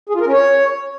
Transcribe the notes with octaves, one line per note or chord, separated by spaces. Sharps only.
G#4
F4
A#4
C#4
C#5